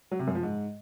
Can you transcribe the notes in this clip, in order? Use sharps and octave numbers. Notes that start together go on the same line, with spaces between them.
F#3
C3
F#2
F3
G#2